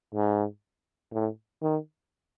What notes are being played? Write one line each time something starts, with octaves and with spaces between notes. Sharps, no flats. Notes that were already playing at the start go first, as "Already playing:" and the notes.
G#2
A2
D#3